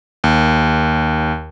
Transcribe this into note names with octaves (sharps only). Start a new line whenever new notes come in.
D#2